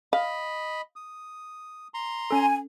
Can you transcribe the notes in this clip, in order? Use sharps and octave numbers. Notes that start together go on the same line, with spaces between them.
D#5 F5 B5
D#6
A#5 C6
C#4 A4 G#5